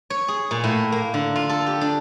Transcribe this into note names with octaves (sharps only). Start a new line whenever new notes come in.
C#5
G#4
A#2
A2
A#3
D3
F4
A4
G4
D4